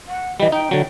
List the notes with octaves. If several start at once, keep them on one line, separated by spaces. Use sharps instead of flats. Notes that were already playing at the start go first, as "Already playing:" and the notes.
F#5
E3 G3 D#5
D#4 G5
D3 F#3